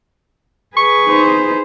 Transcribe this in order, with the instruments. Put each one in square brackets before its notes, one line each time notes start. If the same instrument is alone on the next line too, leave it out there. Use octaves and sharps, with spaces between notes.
[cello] G#4 B4 [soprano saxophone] C#6
[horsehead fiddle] D#4 C5